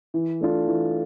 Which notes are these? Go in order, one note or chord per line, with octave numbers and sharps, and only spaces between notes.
E3
A3 D4 F4
E3